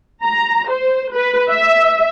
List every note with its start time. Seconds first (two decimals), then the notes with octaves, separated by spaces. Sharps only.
0.23 A#5
0.70 C5
1.14 B4
1.51 E5